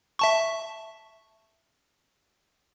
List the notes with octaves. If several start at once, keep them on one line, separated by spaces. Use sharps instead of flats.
E5 A5 C#6